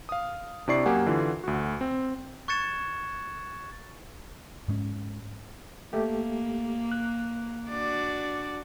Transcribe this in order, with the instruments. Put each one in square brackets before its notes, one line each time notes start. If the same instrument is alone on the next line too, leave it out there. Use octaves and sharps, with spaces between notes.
[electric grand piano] F5 D#6
C3 D4 E4 D5 C#6 C7
F#2 A#3 G4 F#5 G#5
D3 E3 F4
D2 F#4
C4
[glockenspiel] C#6 F#6 G#6 A6 C#7 E7
[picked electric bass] G#2 G#3 C#4
[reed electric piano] A3 G4 [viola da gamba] A#3
[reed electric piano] F#6
[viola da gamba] D4 F#4 D5